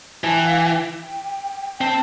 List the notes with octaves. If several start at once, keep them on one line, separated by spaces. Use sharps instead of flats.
E3 A5
G5
F5
G5
C4 A5